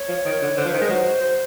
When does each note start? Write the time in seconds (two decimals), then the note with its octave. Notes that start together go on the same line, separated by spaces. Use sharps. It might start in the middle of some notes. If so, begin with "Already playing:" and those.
Already playing: C#5
0.08 F3
0.26 D#3
0.42 D3
0.57 D3 C5
0.65 F3
0.68 B4
0.74 D#3
0.79 G#3 C5
0.90 F#3
1.23 C5